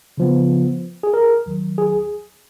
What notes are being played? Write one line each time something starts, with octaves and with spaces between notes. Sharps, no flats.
C#3 F3 B3
G#4
A#4
D#2 D#3 F#3
G#4